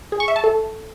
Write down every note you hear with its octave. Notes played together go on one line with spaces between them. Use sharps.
G#4
C#6
E5
A5
A4